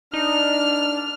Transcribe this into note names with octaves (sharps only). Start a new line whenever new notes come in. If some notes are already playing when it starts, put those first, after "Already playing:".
D4 D#4 F6